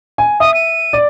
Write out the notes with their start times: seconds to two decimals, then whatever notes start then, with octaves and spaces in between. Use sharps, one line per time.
0.18 G#5
0.40 E5 D#6
0.54 D#7
0.93 D5